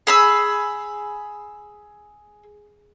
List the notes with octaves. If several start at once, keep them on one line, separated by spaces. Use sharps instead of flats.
G#4 B5 E6